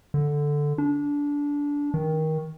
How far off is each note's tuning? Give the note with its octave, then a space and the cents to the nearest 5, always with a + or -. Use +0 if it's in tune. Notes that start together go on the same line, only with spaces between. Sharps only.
D3 +0
D4 -20
D#3 +20